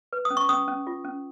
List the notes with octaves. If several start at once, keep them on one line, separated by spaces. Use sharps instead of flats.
B4
D#6
C#4
C#6
C#4 D#6
C#4
F4
C#4